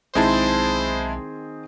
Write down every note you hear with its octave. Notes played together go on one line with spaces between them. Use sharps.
B1 D#3 G#3 C4 E4 G#4 C5 A5